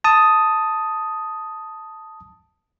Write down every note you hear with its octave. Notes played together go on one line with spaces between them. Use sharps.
A5 D#6